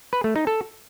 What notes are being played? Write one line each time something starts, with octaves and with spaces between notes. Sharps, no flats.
B4
A3
D#4
A4